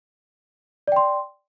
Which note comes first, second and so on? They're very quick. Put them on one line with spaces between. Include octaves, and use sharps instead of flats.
D5 G5 C6